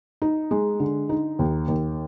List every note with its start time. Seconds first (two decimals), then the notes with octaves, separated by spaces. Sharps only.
0.22 D#4
0.51 G#3
0.80 D3
1.09 D#4
1.39 D#2
1.68 D#2